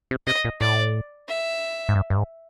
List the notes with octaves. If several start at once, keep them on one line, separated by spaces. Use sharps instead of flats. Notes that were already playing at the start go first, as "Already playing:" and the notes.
C3
C3 D#5
A#2
A2 D5
E5
G#2
G2
G2
G#2